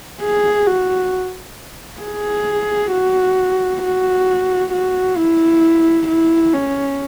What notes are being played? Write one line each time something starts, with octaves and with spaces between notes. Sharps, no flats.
G#4
F#4
G#4
F#4
F#4
F#4
E4
E4
C#4